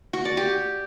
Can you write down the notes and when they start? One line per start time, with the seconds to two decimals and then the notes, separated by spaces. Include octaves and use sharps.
0.13 F#4
0.25 D5
0.37 G4